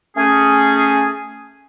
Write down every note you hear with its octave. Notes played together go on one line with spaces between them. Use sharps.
A3 C#4 G#4